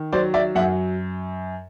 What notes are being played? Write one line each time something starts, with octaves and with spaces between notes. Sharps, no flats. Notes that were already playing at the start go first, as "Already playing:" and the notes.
Already playing: D#3
F#3 C5 D5
D5 E5
F#2 E5 F#5